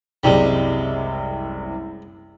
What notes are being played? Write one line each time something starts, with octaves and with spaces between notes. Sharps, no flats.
F#1 C2 C3 G3 G#3